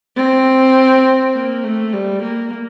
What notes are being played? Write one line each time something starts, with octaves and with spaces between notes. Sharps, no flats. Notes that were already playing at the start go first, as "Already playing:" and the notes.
C4
A#3
A3
G3
A#3